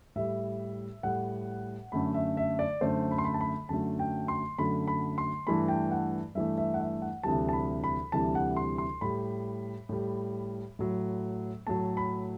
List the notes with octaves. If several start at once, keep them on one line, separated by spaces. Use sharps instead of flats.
A2 G3 E5
A2 G3 F#5
F#2 D3 A3 B5
E5
E5
D5
F#2 D3 A3 C5
B5
C6
B5
A5
B5
F#2 D3 F#3 A3 A5
G5
C6
F#2 D3 F#3 A3 B5
B5
C6
G2 E3 A3 B5
G5
F#5
G2 E3 A3 E5
E5
F#5
E5
F#5
D2 C3 E3 G3 A5
A5
B5
B5
D2 C3 E3 G3 A5
F#5
C6
C6
A2 G3 B5
A2 G3
A2 F#3 A3
A2 F#3 A3 A5
B5